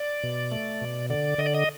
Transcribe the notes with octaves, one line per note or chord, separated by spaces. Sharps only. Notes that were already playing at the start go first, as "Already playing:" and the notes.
Already playing: D5
B2
A3
B2
D3 D5
D3 D#5
D5
D#5